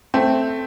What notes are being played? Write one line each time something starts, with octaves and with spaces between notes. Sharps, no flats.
A3 C4